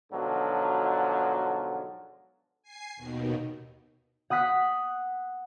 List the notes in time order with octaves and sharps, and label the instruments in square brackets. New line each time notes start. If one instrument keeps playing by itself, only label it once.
[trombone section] G#2 B2 D3 F3 F#3
[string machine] G#5 C7
D#2 B2 D#3
[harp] F#5 D#6 F#6 B6